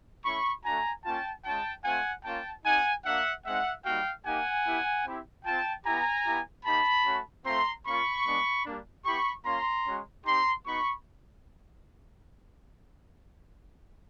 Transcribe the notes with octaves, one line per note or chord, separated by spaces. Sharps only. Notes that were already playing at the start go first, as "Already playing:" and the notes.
A3 C#4 E4 B5 C#6
A3 D4 F#4 G#5 A#5
A#3 C#4 F4 G5 A5
G#3 C#4 F4 G5 A5
A3 C4 F4 F#5 G#5
A#3 C#4 F4 G5 A5
C4 D#4 G4 F#5 G#5
A#3 D4 F#4 E5 F#5
G#3 C4 D#4 E5 F#5
G3 A#3 D#4 F#4 F5 G5
A#3 D#4 G4 F#5 G#5
B3 E4 G4
C4 E4 G4
C4 F4 G5 A5
B3 E4 G4 G#5 A#5
B3 E4 G4
A#3 D#4 G4 A5 B5
A3 C#4 F#4
A3 C4 F4 A#5 C6
A#3 C#4 F4 B5 C#6
G#3 B3 D4
G3 A#3 D4
B3 E4 G4 B5 C#6
A#3 C#4 F4 A#5 C6
G#3 C#4 F#4
C4 D#4 G4 A#5 C6
B3 D#4 F#4 B5 C#6